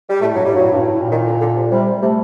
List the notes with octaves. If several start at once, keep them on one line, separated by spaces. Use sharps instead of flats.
G3
A2 A3
G2 F#3
A2 G3
G2 F#3
A2
G2
A2
A2
A#2
D#3
D3
D3
C3
C3 G3
C3 A3